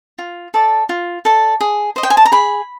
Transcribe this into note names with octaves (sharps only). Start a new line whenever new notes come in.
F4
A4 D5
F4
A4 D5
G#4
C5 D#5
G5
G#5
A5
A#5
G#4 B5